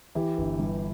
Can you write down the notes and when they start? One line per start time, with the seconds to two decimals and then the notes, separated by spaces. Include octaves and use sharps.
0.15 E3 E4 G4
0.38 G1
0.59 G2